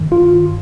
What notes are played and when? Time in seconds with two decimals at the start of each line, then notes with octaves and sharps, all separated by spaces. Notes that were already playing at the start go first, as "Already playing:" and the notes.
Already playing: G2 D#3
0.12 F4